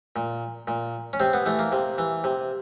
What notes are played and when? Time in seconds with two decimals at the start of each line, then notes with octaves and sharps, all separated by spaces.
0.16 A#2
0.68 A#2
1.13 C#4
1.20 C3 C4
1.33 B3
1.46 E3 A3
1.59 A#3
1.72 C3
1.98 E3
2.24 C3